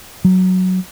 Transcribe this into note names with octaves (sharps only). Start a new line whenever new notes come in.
F#3